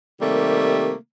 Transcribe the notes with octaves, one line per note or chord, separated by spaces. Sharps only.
C3 D#3 G3 A3 A#3